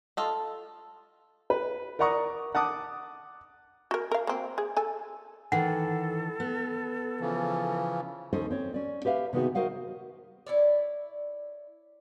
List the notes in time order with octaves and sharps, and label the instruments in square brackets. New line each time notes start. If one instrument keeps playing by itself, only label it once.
[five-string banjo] F4 A4 D#5
[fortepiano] B4
A#4 D5 F#5 A#5 C#6 D#6
F#5 A5 D6 D#6
[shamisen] F#4 A#4
A#4 F5
A#3 C4
G#4
A4 G#5
[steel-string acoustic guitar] D#3 E3 [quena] A4 [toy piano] F#5
[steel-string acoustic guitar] B3
[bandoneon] C#3 E3 F3
[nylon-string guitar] D#2 C#4 A4 C5 D#5
C4 C#5
C#4 D5
G4 B4 E5 F5
C3 D#3 B3 D#4 F#4 G#4
F#4 A#4 C5 D#5 F5 F#5
[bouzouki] E4 C#5 D5